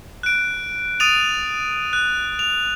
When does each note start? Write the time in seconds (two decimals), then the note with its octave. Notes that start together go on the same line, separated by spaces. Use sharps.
0.23 F#6 D7
1.00 D#6 A6 D7 D#7 F7
1.93 F#6
2.39 F7